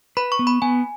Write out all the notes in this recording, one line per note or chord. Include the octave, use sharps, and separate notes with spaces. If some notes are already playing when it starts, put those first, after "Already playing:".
B4 B5
C#6
B3
B5
B3 G#5